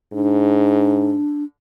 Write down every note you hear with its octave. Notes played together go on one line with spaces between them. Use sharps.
G#2 D4